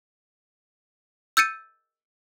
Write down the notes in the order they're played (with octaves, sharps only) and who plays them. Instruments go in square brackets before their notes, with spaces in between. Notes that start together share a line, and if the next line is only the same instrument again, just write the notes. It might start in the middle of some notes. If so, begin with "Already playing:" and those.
[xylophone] E6 G6 A6 C#7 D#7